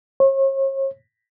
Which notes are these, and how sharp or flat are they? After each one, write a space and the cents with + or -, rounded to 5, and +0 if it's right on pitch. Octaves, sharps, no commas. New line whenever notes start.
C#5 -40